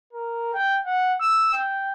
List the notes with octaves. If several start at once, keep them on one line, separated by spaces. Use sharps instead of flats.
A#4
G5
F#5
E6
G5